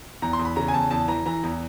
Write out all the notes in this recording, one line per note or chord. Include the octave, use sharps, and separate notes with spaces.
E2 A#5
C6
E2
B5
C#3 A#5
G#5
E2 A5
E2 A5
E3 A#5
E3 A#5
E2